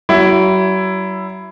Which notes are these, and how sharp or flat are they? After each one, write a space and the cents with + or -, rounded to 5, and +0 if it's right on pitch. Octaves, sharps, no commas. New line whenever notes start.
F#3 +35 E4 +10